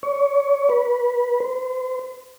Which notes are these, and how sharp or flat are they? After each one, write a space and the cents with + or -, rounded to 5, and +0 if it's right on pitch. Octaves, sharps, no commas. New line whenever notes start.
C#5 +25
B4 -20
C5 -40